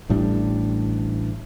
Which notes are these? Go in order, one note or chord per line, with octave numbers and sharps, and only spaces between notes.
A1 A2 G3 D4